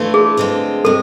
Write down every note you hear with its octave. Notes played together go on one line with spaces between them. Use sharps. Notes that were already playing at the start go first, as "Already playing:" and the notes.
Already playing: E3 A3 D4 F4
G#4
D3 G#3 C4 F4
C3 G#3 A4